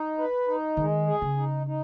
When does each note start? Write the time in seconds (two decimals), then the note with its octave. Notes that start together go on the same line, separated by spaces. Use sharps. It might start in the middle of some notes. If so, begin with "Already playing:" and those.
Already playing: D#4
0.18 B4
0.48 D#4
0.77 D#3 G#3
1.07 G#4
1.22 C#3
1.37 D#4
1.67 D#4